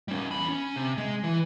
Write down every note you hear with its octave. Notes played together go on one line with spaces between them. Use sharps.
G3 C#4
E2 B5
C#4
C3
G#3
E3